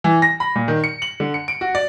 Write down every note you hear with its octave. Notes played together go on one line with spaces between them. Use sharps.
E3
A#6
B5
A#2
D#3
C#7
F#7
D3
C#7
D7
F#4
D5